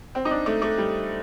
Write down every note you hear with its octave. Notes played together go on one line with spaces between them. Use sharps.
C4
D#4
D4
A3
A3
G3